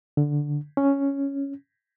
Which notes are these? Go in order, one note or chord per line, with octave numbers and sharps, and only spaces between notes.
D3
C#4